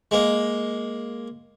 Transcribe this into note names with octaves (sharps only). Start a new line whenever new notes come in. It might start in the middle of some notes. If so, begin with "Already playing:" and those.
G#3 A#3